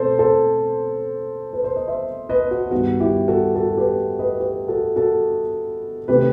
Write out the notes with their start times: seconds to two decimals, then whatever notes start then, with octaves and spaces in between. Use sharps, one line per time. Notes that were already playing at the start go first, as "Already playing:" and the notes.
Already playing: B2 A3 C4 A4 C5
0.19 A4 C5
1.53 B4
1.64 C5
1.76 D#5
1.88 C5 E5
2.29 B4 D#5
2.51 F#4
2.71 G2 D#3 G3 B3 F#4
3.00 E4 G4
3.28 F#4 A4
3.55 F#4 A4
3.77 G4 B4
4.19 B4 D#5
4.40 G4 B4
4.68 F#4 A4
4.96 F#4 A4
6.08 C3 D#3 A3 C4 G4 B4